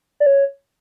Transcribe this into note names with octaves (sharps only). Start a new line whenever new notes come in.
D5
C#5